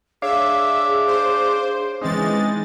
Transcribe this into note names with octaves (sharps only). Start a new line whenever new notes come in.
D4 G#4 C#5 E5 F5 D6
C5
E3 G#3 C4 C#4 D#4 A6